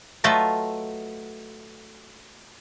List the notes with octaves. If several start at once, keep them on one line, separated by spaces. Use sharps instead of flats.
F#3 A3 F4 B4 D#5 E5